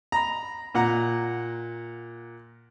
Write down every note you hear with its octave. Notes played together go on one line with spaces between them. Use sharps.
A#5 B5
A#2 F#5 A#5